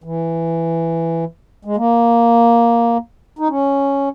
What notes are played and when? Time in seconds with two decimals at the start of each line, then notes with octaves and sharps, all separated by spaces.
0.04 E3
1.65 G#3
1.77 A#3
3.39 D#4
3.49 C#4